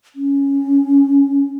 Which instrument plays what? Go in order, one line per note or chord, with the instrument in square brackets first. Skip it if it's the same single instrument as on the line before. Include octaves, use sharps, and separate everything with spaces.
[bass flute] C#4